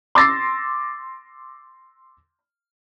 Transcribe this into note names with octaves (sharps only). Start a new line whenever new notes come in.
C6 D6 E6 A6 A#6 C7